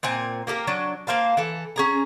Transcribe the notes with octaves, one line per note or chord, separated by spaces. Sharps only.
A#2 C4 G#5
A#3 G4 A4 A#4
F#3 D4
A#3 C5 F5 A5
E3 A4
C#4 G#4 A#5